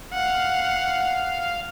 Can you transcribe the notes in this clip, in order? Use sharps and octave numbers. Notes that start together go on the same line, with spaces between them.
F5 F#5